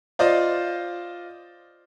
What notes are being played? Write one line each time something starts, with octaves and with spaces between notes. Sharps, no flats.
F4 C5 D5 D#5